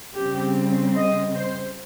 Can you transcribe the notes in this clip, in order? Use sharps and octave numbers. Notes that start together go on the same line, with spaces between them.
C#3 G3 C4 G4
D#5
C5